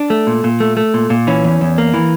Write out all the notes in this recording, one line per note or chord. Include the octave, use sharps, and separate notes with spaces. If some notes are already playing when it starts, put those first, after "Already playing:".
Already playing: D4
A3
A#2
A#2
A3
A3
A#2
A#2
E3 C#4
E2
E2
A#3
E3